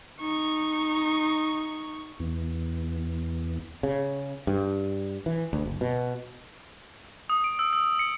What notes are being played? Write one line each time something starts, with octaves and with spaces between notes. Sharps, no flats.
D#4 C#6
E2
C#3
G2
E3
D2
F#1
B2
D#6
D7
E6
E6
C#7